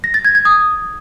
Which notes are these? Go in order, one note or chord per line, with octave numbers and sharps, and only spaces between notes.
A#6
A6
G#6
G#6
D#6